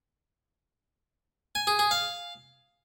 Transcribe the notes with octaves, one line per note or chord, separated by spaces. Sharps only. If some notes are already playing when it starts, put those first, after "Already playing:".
G#5
G#4
G#4
F5